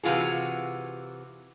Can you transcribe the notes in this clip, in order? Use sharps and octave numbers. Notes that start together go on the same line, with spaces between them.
C3 E3 G#3 F4 F#4 G#4